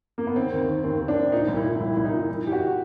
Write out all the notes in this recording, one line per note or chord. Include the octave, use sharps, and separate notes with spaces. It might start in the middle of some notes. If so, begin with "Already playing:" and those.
A#3
B3
D#3 C4
D#2
D#3
D#2 C4
D#2
D4
D#2
A#2 D#4
C2
E4
A#2
C2 E4
C2 E4
D#4
A#2
E3
E3 G4
F#4